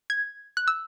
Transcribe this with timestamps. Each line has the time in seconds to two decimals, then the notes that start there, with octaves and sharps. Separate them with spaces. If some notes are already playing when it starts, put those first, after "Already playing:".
0.10 G#6
0.57 F#6
0.68 E6